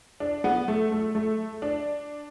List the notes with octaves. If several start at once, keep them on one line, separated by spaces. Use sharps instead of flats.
D4
B3
A3
A3
A3
D4